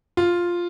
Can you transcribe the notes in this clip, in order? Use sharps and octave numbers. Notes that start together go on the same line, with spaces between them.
F4